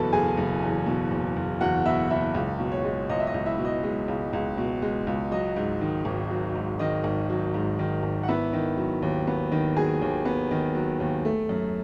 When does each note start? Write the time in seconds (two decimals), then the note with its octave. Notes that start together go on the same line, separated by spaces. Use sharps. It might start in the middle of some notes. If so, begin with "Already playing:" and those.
Already playing: F#1 E2 B2 E4 A4 B4 A5 B5
0.13 F#1 G#4 G#5
0.37 F#1
0.62 E2
0.86 B2
1.11 F#1
1.36 F#1
1.61 E2 F#4 F#5
1.86 B2 E4 E5
2.10 F#1 E4 E5
2.35 C#2
2.59 B2
2.72 C#5
2.84 G#3
3.09 C#2 D#5
3.20 E5
3.27 D#5
3.34 C#2
3.46 E4 E5
3.59 B2
3.65 D#5
3.83 G#3
4.08 C#2
4.33 C#2
4.58 B2
4.82 G#3
5.07 C#2
5.32 F#3 D#5
5.56 G#2
5.81 D#3
6.05 G#1
6.30 F#3
6.55 G#2
6.79 D#3 D#5
7.04 G#1
7.30 F#3
7.54 G#2
7.79 D#3
8.03 G#1
8.23 F#5
8.28 B3 E4 E5
8.53 D#3
8.77 F#3
9.02 D#2
9.27 B3
9.52 D#3
9.76 F#3 G#4 G#5
10.01 D#2
10.25 B3
10.51 D#3
10.75 F#3
11.00 D#2
11.25 A3
11.49 F#2